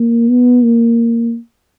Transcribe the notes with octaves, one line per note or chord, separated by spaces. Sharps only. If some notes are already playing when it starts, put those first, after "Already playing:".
Already playing: A#3
B3
A#3